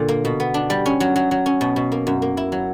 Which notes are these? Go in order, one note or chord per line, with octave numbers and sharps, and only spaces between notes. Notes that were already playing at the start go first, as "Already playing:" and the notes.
Already playing: A#2 D3
A#3
B2
B3
D4
G3
C#4
F#3
F#3
F#3
C#4
B2
B2
A#3
F#2
A#3
E4
F#3